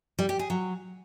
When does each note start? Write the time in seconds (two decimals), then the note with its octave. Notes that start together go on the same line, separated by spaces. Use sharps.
0.19 G3
0.29 G4
0.39 G#4
0.50 F#3